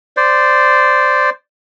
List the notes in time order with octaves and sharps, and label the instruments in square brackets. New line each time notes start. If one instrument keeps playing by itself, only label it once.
[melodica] C5 D5